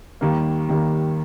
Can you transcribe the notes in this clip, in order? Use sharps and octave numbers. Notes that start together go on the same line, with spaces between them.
D#2 D#3 G3 A#3
D#2 D#3 G3 A#3